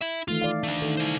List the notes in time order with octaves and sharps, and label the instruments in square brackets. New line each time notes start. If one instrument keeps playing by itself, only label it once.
[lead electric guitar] E4 E5
[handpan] D#3 E3 A3 [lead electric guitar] F4
[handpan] D5 F5
[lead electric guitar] A3 D4
[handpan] D#3 A4
[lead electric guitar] E4 C5